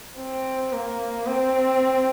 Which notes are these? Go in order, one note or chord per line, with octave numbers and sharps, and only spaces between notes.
C4
A#3
C4